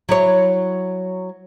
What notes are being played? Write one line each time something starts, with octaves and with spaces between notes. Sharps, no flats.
F#3 E4 C#5